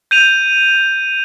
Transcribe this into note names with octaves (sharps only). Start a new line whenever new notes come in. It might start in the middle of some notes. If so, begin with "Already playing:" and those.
G6 D#7 F7